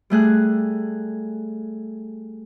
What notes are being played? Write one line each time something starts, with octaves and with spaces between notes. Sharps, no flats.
G3 A3 G#4 F#6